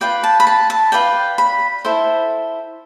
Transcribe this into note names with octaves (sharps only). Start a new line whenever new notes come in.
F4 B4 D5 G5
A5
B5
A5
A5
F4 B4 D5 G5
B5
E4 A4 C5